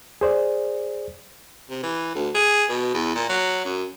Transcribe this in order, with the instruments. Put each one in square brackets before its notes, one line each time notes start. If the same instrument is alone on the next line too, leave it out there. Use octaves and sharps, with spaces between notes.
[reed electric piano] G#4 C5 D5
[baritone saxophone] C3
E3
D2
G#4
B2
E2
A#2
F#3
F#2